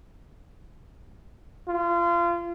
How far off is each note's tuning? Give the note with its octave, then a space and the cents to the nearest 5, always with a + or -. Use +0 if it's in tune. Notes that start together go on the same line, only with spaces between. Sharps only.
F4 -30